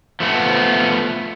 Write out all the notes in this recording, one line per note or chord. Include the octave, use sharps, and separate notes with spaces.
F3 A3 B3